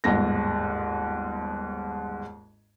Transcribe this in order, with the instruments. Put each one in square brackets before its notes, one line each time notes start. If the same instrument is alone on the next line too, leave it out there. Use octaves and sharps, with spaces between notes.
[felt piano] G1 D#2 G#2 A#6